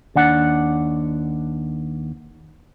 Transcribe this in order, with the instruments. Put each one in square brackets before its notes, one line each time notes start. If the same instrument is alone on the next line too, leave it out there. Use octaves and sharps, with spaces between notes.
[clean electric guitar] D#2 D4 F#5